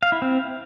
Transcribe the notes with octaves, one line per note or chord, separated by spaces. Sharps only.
F5
E4
C4